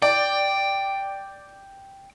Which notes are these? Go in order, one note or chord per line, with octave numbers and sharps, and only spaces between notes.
D5 G5